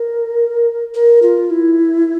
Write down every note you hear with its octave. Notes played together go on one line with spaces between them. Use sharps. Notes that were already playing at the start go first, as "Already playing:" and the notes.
Already playing: A#4
A#4
F4
E4